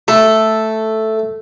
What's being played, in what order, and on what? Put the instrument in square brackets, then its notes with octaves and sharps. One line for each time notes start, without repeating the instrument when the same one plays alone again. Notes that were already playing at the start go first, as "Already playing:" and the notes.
[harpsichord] A3 [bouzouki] A4